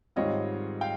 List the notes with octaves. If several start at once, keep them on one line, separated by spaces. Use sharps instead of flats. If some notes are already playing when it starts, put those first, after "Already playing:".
G#2 D#3 G3 C4 F4 C#5 D#5
F5 G5